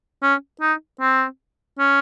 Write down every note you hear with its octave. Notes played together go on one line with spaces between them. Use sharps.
C#4
D#4
C4
C#4